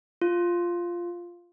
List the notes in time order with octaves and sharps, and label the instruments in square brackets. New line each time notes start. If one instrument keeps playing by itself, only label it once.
[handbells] F4